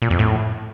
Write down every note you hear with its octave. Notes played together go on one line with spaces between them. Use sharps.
A#2
F2
A2